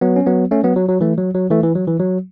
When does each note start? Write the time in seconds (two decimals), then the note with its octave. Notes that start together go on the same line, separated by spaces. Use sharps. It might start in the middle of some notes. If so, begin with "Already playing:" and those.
0.01 F#3 B3
0.16 C#4
0.26 F#3 B3
0.51 A3 C#4
0.64 F#3 B3
0.76 F#3
0.89 F#3
1.01 E3 A3
1.18 F#3
1.35 F#3
1.50 E3 A3
1.63 E3
1.75 F#3
1.87 E3
2.00 F#3